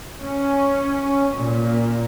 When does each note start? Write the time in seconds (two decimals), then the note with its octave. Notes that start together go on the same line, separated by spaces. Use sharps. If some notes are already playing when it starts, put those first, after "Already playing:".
0.23 C#4
1.36 A#2